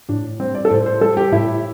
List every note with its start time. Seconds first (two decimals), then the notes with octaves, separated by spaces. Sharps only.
0.09 A2 D4
0.40 G3 C4
0.55 D5
0.65 A4
0.71 A2 C5
0.86 C5
1.01 G3 A4
1.17 G4
1.32 A2 E4